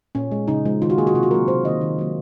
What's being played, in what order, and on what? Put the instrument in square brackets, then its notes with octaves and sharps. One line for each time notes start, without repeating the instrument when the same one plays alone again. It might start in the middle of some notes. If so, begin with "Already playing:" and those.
[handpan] A#2 C#4
G#3
C#3 D#4
F3 G#3
D#3 F4
F#4
A#3 G#4
F#4
C3 F4
F#4
F#3 A#3 A#4
C3 C5
D#3 A#3 D#5
D#3
F#3 A#3